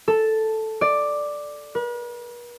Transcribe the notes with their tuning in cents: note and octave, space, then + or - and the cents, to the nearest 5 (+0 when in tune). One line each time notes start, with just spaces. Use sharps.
A4 +0
D5 +5
B4 -45